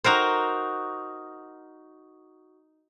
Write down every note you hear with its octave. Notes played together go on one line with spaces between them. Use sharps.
D#4 F#4 A#4 C5